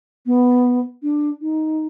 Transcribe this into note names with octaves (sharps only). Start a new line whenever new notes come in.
B3
D4
D#4